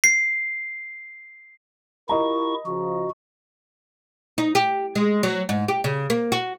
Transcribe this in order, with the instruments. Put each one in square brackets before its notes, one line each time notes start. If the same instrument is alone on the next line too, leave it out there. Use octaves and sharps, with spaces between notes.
[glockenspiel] C7
[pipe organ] E4 C#6 [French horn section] F4 G4 A#4 [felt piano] D#5 A#5
[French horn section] C#3 F3 [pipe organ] F#4
[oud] D#4
G4
G#3
F#3
G#2
G4
C#3
A#3
F#4